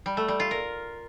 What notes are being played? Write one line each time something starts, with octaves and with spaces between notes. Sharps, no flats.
G3
A3
G3
F4
A#4